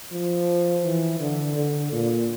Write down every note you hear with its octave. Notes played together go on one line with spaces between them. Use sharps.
F3
E3
D3
D3
A#2